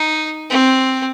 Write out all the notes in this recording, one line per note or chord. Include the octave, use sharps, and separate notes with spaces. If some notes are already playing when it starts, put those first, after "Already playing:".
Already playing: D#4
C4